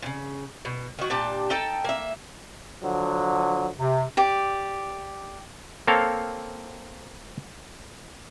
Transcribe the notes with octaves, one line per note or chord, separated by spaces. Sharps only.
A#2 C#3
B2
D#3 F#4
A#2 D4 G4 A5
D#4 A4 G5 A5
A#3 E5
D3 F3 F#3
C3
G4 D5
A#3 C4 A4 A#4 C#5 F5